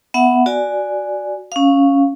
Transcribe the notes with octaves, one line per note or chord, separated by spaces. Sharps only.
B3 E5 F#5
F#4 D5 G#5
C#4 F5